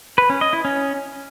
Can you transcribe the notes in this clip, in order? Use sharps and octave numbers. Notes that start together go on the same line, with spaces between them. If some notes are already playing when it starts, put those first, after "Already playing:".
B4
C#4
D#5
E4
C#4